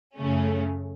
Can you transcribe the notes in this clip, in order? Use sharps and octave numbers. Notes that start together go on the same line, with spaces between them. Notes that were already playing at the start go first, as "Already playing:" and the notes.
F#2 C#3 A3 C#4